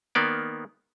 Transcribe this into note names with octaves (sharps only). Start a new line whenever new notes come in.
D#3 A#3 B3 D5